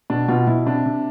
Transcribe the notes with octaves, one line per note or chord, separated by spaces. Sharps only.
B2 D4
B2 F4
B2 E4
C3 D4
C3